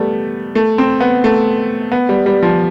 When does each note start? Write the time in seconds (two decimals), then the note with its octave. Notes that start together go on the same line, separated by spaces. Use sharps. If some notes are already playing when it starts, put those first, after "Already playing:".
Already playing: G3 A3 B3
0.55 A3
0.78 C4
1.00 B3
1.24 A3
1.92 B3
2.09 G3
2.26 G3
2.43 F3